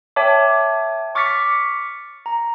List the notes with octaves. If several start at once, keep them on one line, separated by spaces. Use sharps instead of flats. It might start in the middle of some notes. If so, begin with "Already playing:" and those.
C#5 E5 G5 A5 D6
C#6 D6 F6 A6 B6 C#7
A#5